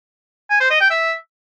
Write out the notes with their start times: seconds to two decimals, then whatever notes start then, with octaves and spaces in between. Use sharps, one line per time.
0.50 G#5
0.60 C5
0.70 D#5
0.80 G5
0.90 E5